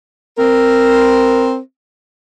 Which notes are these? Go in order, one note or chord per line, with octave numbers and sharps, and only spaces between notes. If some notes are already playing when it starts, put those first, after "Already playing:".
C4 A#4